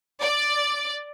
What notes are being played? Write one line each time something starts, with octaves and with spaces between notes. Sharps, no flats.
D5